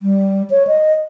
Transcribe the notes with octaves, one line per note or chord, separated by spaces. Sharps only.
G3
C#5
D#5